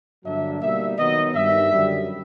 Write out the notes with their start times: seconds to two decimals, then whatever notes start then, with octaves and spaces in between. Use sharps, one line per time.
0.23 G2 D3 F#3 A#3 D4 E5
0.60 B2 G3 A#3 D#4 E5
0.97 D#3 F#3 B3 D#4 D#5
1.34 G2 D#3 G3 E5
1.71 F#2 D3 G3